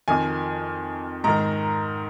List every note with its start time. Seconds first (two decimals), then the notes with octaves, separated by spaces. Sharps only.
0.08 F2 D#3 G#5
1.24 G#2 D#3 A#5